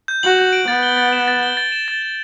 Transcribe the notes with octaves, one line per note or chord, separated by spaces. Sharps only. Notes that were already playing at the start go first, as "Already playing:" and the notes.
G6
F#4 F#7
G6
D7
B3 A6
G7
A6
E7
A6
G7
A6
E7
A6
G7